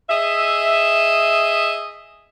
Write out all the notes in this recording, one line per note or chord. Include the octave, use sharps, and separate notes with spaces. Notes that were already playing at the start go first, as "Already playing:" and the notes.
G#4 D#5 E5